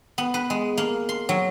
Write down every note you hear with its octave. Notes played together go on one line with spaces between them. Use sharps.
B3
B4
G#3
A#3
C6
F#3